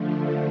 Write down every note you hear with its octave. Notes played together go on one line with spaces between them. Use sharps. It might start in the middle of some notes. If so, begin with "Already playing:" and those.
Already playing: D3 F3 A3